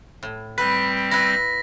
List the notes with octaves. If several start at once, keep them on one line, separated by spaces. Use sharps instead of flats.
A2
G3 C4 B4 B6
E4 B4 A#6